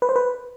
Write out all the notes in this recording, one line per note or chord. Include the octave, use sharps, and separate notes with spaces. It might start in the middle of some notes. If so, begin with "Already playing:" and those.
B4
C5
B4